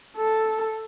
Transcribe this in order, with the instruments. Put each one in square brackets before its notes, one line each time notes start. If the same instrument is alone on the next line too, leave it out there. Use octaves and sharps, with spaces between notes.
[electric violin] A4